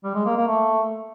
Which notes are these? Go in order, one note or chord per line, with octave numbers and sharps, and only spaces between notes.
G3
G#3
A#3
A#3
A3